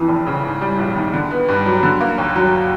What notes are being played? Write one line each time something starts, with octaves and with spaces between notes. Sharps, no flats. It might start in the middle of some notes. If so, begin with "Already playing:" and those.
Already playing: F2 E3
F1
C#3
G#2
G3
A#1
D#3
D3
B3
G2
F#3
D3
A#3
D#2
F#3